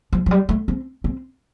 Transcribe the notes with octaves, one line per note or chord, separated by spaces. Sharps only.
F3
F3
G3
A3
C4
C4